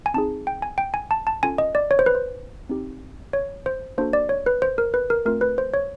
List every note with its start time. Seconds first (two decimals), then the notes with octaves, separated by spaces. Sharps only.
0.06 G#5
0.14 C4 D#4 G#4 A5
0.47 G5
0.62 G#5
0.78 G5
0.94 G#5
1.11 A5
1.27 A5
1.43 C#4 F4 A4 G#5
1.58 D#5
1.75 D5
1.91 C#5
1.99 C5
2.06 B4
2.15 C5
2.69 C4 D#4 G4
3.33 C#5
3.66 C5
3.98 A#3 D4 F#4 A4 C5
4.13 D5
4.29 C#5
4.46 B4
4.62 C5
4.78 A#4
4.94 B4
5.10 A#4
5.25 A3 C4 F4 A#4
5.41 B4
5.58 C5
5.74 C#5